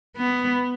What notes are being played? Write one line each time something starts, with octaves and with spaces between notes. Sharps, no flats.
B3